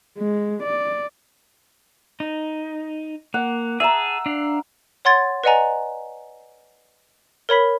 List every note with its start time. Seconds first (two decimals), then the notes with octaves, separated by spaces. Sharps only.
0.18 G#3
0.63 D5
2.20 D#4
3.34 A#3 F#5
3.80 G#4 E5 A5 A#5
4.26 D4 F5
5.05 C#5 F#5 C6 G#6 A6
5.44 B4 D5 D#5 F#5 G#5 A#5
7.49 A#4 C#5 B5 B6